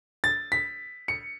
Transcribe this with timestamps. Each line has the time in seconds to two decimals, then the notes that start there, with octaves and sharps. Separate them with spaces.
0.24 A6
0.52 B6
1.08 C#7